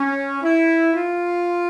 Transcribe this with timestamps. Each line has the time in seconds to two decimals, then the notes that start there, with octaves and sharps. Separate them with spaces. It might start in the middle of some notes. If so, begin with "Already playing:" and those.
Already playing: C#4
0.43 E4
0.94 F4